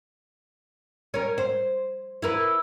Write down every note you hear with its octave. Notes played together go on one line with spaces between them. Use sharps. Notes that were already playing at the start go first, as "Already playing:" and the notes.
C#4 A#4
C5
E4 A#4 B4